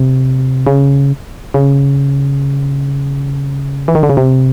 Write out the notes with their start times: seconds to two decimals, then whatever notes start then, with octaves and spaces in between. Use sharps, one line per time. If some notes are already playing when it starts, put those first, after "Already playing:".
Already playing: C3
0.67 C#3
1.54 C#3
3.88 E3
3.95 D#3
4.03 D3
4.10 C#3
4.17 C3